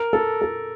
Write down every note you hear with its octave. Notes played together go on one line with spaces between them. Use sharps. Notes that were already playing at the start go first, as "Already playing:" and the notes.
Already playing: A#4
A4
A4